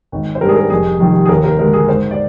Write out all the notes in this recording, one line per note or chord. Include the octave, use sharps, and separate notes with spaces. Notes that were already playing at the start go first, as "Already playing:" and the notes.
G#1
C5
G#2 G3 D4 A#4
G#4
A#4
F1 G#4
F2 C3 D#3 G3
G#4
D#2 A#4
A#4
D3 G#3 A#4
G#4
G#2 C5
D5